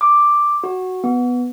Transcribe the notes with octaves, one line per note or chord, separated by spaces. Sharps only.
D6
F#4
B3